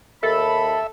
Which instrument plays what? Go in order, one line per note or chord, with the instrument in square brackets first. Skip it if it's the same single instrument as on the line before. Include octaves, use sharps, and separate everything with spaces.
[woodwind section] D#2 B5 [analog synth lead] A4 [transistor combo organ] E5